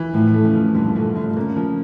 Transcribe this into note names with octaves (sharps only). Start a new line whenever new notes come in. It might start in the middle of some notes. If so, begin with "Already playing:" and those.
Already playing: E3
A2 F3
A3
C#3
F3
G2 A#2 D3
A#2 D3 A3
D3 A3
C#3
A#2
C#3 A#3
F3